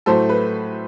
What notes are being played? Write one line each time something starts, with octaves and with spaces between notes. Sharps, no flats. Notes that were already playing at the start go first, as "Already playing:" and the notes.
A2 F#3 A3 A4 C5
B4